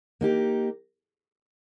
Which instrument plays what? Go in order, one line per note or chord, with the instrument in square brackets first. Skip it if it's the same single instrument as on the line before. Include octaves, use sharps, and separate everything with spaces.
[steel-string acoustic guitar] A#3 D#4 G4